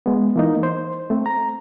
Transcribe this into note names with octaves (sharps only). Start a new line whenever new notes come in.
G#3 B3
E3 A#3 D#4
C5
A3 C4
A#5